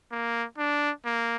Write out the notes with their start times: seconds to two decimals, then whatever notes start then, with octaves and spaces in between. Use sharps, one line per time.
0.12 A#3
0.58 D4
1.05 A#3